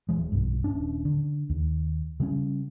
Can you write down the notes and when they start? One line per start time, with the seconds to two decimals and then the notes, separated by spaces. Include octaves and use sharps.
0.09 D#1 E3 G#3
0.32 B1 G2
0.64 D#1 C#4 D4
1.05 D3
1.49 D#2
2.20 C#3 G3 C#4